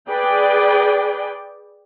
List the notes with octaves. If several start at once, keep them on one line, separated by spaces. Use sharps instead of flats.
G#4 B4 D5 G5